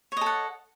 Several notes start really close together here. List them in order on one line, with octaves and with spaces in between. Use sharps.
C#5 D#5 A4 F#5